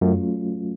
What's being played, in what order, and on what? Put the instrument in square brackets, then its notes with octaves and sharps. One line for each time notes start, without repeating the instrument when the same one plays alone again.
[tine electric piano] F#2 [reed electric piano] F#3 A3 C#4 F4